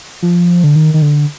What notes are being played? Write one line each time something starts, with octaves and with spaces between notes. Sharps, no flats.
F3
D3
D#3
D#3
D3